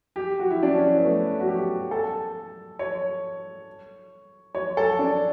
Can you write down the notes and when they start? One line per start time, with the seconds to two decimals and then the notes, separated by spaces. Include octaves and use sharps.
0.16 G4
0.40 F#4
0.51 E4
0.63 D4
0.74 C#4
0.96 B3
1.04 A3
1.40 F#4
1.48 G4
1.91 A4
2.79 C#5
4.55 C#5
4.77 A4
4.99 D4